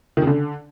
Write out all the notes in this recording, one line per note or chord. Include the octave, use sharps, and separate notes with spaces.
D#3
C#3
D3